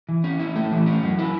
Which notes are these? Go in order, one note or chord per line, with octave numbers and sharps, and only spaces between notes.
E3
C#4
E4
A3
E3
C#4
F#3
E4